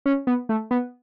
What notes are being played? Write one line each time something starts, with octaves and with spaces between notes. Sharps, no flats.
C#4
B3
A3
B3